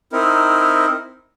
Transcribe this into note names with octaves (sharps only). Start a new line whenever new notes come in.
C4 D#4 E4 A#4